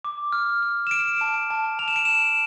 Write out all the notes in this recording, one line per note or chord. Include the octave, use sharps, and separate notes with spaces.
D6
F6
F6
E7
F6 D7
A5
A5
A5 F7
E7
D7
A5 E7